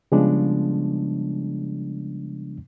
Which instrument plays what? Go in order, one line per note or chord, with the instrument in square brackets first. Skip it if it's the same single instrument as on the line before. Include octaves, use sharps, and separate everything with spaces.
[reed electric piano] C#3 F3 G3 G#3 B3 D4